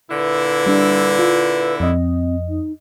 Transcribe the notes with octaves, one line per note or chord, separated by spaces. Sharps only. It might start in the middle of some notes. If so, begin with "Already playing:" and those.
A#2 D3 E4 B4
G3 D4
F4
F2 C4 D#5
D#4